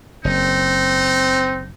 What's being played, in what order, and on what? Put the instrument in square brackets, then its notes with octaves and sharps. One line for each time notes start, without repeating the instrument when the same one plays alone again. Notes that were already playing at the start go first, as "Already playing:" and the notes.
[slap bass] F#1 [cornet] C4 [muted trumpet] D#4